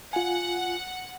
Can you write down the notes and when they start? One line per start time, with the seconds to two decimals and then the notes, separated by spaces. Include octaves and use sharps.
0.13 F4 F#5 G#5